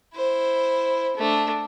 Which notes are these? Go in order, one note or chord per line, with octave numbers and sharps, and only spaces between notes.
E4 C5
A3 D4